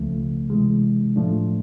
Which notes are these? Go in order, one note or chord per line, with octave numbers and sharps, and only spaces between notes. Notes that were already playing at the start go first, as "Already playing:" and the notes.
Already playing: C#2 C#3 F3 A3
C3 E3 G#3
A2 F3 A3 D4